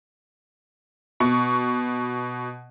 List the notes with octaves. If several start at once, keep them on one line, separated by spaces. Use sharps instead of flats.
B2 C#6